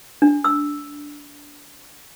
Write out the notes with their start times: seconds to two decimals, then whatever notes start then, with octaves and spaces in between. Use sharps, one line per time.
0.22 D4
0.44 E6